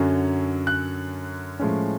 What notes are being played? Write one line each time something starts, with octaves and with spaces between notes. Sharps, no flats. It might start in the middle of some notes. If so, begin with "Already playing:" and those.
Already playing: F#2 D3 F#3 C#4
F#6
A2 F3 G#3 C#4